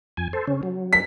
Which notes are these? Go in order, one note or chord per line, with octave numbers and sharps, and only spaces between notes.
F2 G#5
A4 C5
C#3 C#4
F#3
B6